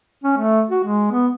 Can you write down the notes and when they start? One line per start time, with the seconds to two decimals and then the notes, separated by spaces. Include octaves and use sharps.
0.24 C#4
0.38 A3
0.70 F#4
0.85 G#3
1.11 B3